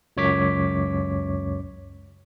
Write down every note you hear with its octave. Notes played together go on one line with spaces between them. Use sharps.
C#2 F#2 C#5 D6 B6